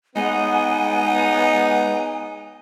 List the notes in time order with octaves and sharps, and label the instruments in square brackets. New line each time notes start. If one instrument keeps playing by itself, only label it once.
[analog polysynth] G#3 F#5 [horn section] B3 [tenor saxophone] D#4 [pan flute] G#5